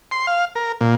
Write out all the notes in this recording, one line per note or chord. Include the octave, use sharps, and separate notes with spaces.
C6
F5
A#4
A#2